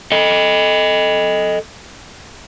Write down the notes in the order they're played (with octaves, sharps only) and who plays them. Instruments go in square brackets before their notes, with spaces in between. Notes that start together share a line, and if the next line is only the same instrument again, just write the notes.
[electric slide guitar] A4 D#5